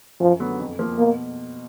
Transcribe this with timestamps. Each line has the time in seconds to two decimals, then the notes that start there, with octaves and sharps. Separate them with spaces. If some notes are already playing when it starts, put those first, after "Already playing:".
0.20 F#2 F3
0.40 D3 F#3 B3
0.60 F2
0.79 F3 A#3
0.99 B2 A#3